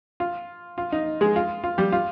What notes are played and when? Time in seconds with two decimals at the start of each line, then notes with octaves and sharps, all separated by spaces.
0.20 F4
0.78 F4
0.92 D#4
1.21 G#3 G#4
1.36 F4
1.64 F4
1.78 G3 G4
1.92 F4